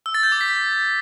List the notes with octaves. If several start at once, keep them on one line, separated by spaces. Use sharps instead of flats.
E6
A6
G6
D6
B6